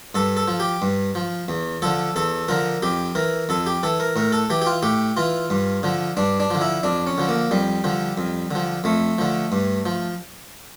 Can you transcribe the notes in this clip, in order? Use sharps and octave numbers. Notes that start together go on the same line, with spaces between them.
G2 A4
A4
F3
G4
G2
F3
E2
D3 F3 A4
E2 A4
D3 F3 A#4
F2 G4
E3 A#4
F2 A4
G4
E3 A4
A#4
A2 A#4
A4
E3 G4
G4
F4
A2 G4
E3 F4
G2
D3 F3
G2 D4
D4
D3 F3
E4
F2 D4
C#4
D3 F3
A#3
F2 G3
D3 F3
F2
D3 F3
F2 A3
D3 F3
G2
F3